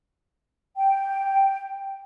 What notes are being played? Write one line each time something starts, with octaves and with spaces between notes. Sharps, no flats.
G5